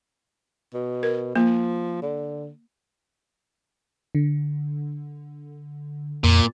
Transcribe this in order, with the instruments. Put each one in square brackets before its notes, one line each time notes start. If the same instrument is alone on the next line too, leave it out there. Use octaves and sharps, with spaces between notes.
[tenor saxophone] B2
[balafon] A#4
[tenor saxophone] F3 [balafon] A#3
[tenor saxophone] D3
[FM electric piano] D3
[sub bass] F2 [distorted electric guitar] A#2